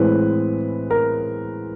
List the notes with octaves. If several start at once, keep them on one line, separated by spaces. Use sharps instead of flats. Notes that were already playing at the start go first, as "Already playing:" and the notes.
Already playing: A2 E3 G#3 C4 B4
A#4